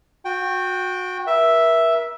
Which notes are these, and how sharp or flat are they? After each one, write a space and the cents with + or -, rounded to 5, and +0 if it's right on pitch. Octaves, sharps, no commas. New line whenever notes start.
F#4 -25 G5 +0
A#4 +40 E5 +0